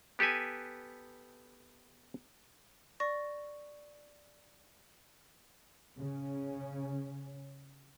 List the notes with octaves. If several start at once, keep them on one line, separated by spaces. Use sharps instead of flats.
B3 G4 A4 B4 G#5
D5 C#6 A#6
C#3 C#4